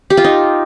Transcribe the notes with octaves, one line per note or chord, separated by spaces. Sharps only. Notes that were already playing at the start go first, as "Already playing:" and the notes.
G4
F4
D#4